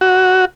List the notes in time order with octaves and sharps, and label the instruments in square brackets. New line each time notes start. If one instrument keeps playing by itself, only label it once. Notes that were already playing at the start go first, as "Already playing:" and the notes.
[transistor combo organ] F#4